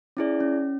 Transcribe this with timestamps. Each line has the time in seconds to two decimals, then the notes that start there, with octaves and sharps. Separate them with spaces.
0.17 C#4 E4 G#4 D5
0.40 C#4